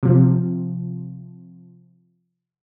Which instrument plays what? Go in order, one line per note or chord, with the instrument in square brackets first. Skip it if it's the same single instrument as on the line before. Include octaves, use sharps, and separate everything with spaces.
[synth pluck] C3 F3